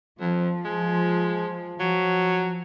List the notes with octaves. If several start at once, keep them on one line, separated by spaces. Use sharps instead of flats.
F2 F3
G#3
F3 F#3